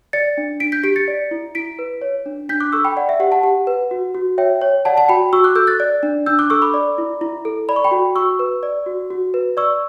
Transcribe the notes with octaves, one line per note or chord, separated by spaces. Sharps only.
D5 A6 C#7
D4
D4 B6 D7
G6 B6
G4 B6 D7
A6 C#7
D5
E4
E4 B6 D7
B4
C#5
D4
D4 G6 B6
D6 F#6
A4 C#6 E6
G5 B5
D5 F#5
E5
G4 F#5
F#5 A5
G4 F#5
B4
F#4
F#4
C#5 E5 G5
C#5
D5 F#5 A5
F#5 A5
F#4 G5 B5
F#4 C#6 E6
D6 F#6
A4 E6 G6
F#6 A6
D5
D4
D4 E6 G6
D6 F#6
A4 C#6 E6
B5 D6
D5
E4
E4
A4
D5 B5
C#6
G5 B5
F#4
F#4 C#6 E6
B4
D5
F#4
F#4
B4
D5 C#6 E6